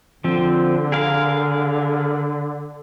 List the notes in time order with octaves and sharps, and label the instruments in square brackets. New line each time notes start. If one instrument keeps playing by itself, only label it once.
[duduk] D3 [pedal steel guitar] F3 C4
[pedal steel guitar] G#4 A#4 F5